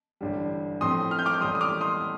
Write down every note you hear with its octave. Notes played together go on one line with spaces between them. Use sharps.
A1 G2 D3 G3
A2 F3 C4 C6 D#6
F6
G6
D6 F6
A1 A2 G3 C6 D#6
D#6
D6 F6
C6 D#6